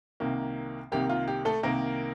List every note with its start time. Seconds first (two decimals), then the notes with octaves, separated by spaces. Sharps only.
0.20 C2 C3 D#3 A#3
0.92 C2 C3 D#3 A#3 G4
1.09 F4
1.28 G4
1.45 A3 A4
1.63 C2 C3 D#3 A#3 A#4